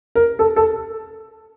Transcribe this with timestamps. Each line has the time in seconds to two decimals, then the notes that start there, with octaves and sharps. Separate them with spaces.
0.15 A#4
0.39 A4
0.56 A4